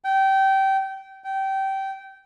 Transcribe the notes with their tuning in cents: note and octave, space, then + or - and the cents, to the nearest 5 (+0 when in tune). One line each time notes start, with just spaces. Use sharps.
G5 -20
G5 -20